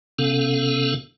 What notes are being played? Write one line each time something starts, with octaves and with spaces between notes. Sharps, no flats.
C3 B3 C#4 A4 F5